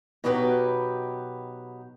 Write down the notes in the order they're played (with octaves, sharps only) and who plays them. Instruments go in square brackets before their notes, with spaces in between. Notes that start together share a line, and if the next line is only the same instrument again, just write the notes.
[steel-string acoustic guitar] B2 F#3 D#4 G4 A#4 B4